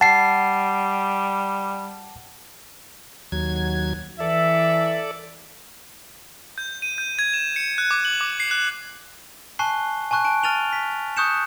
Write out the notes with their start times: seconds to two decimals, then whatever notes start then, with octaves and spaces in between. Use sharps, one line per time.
0.01 G3 F#5 A5 C7
3.32 D#2 F#3 G#6
4.20 E3 A4 D5 E5
6.58 G6
6.82 D#7
6.98 G6
7.19 G#6
7.33 E7
7.56 C#7
7.78 F#6
7.91 D6
8.05 F#7
8.21 D6
8.40 C7
8.51 F#6
9.59 G#5 A5 C#6 F#6 C7 G7
10.11 G#5 A5 C#6 F#6
10.25 A5 D7
10.43 F6 A6 D#7 F7 G7
10.73 B6
11.17 C#6 D#6 F#6 G6 C#7 E7